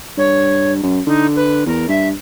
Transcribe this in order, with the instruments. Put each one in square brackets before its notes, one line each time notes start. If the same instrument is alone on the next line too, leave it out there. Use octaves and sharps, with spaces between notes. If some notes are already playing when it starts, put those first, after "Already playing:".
[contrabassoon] G2 [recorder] C#5
[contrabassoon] F#2
[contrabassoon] D3 [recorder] D#4
[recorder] B4
[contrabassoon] E2 [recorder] A#4
[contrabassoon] G2 [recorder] E5